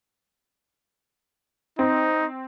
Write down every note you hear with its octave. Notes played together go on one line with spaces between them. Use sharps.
C4 D#4